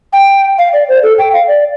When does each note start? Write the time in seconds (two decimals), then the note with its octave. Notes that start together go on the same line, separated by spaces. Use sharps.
0.13 G5
0.58 F5
0.73 D5
0.88 C5
1.03 A4
1.18 G5
1.33 F5
1.48 D5